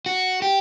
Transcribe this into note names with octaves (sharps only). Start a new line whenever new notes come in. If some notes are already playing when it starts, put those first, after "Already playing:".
F#4
G4